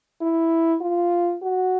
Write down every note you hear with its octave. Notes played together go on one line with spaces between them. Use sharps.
E4
F4
F#4